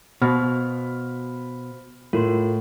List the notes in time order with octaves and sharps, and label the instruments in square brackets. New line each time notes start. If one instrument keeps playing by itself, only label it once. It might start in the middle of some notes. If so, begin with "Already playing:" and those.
[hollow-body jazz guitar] B2 [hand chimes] B3 C5 [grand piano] B5 F6
[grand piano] A2 [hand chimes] F4 A#4 C6